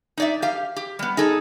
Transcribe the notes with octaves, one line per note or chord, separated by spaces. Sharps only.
D#4 D5 E5
G4 F5
G4
G3 B3
D#4 G#4 A4